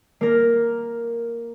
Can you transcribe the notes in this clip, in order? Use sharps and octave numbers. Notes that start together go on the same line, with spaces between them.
A#3 A#4